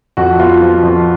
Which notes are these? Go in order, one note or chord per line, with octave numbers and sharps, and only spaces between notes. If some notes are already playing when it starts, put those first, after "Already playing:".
F2 F#4
B3 F4
F3
F2